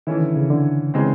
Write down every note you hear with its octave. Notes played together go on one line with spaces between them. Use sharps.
D#3 E3 A3 C#4 E4
D3
C#3
D3
C#3 E3 G#3 C4